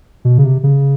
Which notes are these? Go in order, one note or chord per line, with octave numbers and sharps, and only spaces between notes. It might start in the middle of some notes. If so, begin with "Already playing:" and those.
B2
C#3
C3
C#3